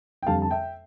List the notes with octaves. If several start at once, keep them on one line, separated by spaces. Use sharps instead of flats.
G5
F2 D3 G3 F5 A5
A5
E5 G5